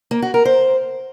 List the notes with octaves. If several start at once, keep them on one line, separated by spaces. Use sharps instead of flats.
A#3
F#4
A#4
C5